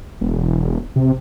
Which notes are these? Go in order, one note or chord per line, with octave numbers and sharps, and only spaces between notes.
E1
C3